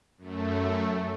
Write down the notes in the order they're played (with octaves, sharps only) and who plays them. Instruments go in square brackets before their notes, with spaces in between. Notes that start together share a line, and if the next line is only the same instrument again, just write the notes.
[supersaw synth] F#2 A3